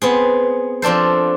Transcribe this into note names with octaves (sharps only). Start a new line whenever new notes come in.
B3 C4 G#4
F3 C4 D4 A4 C5